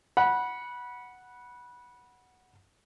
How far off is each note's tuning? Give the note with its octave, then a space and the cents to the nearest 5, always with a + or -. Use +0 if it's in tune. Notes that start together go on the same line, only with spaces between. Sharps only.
F#5 +0 B5 -20